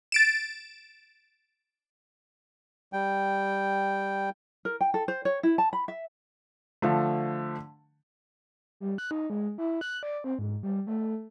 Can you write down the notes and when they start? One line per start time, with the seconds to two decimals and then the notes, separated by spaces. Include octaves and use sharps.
0.12 A6 D7 E7
2.93 G3 G5
4.65 A#4
4.81 G5
4.94 A4
5.08 C5
5.25 C#5
5.43 E4
5.58 A5
5.73 B5
5.88 E5
6.82 D3 F3 A3
8.80 G3
8.98 F#6
9.11 D#4
9.30 G#3
9.58 E4
9.81 F#6
10.03 D5
10.24 C4
10.39 G#2
10.63 G3
10.87 A3